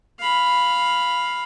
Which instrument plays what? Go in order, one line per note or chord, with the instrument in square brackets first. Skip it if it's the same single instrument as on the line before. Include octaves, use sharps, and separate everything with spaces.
[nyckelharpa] F5 B5